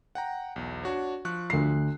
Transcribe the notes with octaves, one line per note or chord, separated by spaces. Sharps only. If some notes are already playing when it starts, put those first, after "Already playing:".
F#5 G5 A#5
B1 E2
D4 F#4 C#5
F3 C#6 F#6
D2 C7